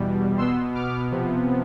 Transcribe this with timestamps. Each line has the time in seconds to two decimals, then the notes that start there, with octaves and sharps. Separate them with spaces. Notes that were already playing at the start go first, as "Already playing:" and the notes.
Already playing: E2 B2 G3
0.38 B2 B3 C6 E6
0.75 D6 F6
1.11 C3 F3 B3